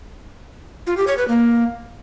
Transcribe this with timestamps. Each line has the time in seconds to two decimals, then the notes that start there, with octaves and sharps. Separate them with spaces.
0.87 F4
0.97 G4
1.07 C#5
1.18 B4
1.28 A#3